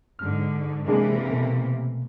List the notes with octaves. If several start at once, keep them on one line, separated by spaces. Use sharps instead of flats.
G#2 D3 F6
C3 E3 G#3 A#3 D4 G#4
B2 A3